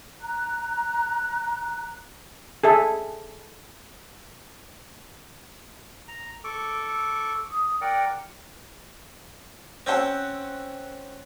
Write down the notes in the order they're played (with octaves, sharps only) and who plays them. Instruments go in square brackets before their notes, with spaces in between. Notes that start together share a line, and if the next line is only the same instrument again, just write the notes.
[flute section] A#5 F#6
[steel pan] G#4 A4 E5
[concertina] A#5
A4 C#6 D6
[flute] D#6
[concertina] A#4 D5 F#5 [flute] G5
[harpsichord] C4 C#4 C5 [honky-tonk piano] F#5 E6 G6